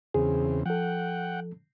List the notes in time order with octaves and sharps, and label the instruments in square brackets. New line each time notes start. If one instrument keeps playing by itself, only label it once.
[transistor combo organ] E2 C#3 C4 [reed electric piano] G#4
[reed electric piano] F3 A4 [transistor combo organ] F#5 G5